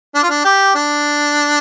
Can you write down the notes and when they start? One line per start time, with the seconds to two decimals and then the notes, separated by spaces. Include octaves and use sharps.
0.15 D4
0.23 F4
0.30 D4
0.45 G4
0.75 D4